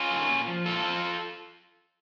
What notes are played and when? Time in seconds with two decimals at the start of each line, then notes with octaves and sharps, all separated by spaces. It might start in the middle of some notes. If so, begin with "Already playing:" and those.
Already playing: C#4 F4
0.11 D#3 F#3
0.30 A#2
0.47 F3
0.65 A#2 F4 A4
0.84 F3